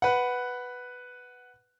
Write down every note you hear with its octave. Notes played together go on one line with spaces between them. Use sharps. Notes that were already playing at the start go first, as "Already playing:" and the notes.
B4 F#5